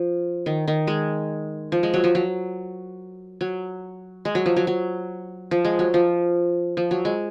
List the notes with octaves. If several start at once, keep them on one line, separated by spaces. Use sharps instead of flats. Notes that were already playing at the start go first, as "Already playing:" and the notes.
Already playing: F3
D#3
D#3
G#3
F3
G#3
F#3
F3
F#3
F#3
G#3
F#3
F3
F#3
F#3
F3
G#3
F#3
F3
F3
F#3
G#3